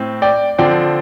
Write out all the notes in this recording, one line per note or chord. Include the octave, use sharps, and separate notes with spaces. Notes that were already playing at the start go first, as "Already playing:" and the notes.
Already playing: A2 C4
D5 G5
D3 F3 C4 D5 G5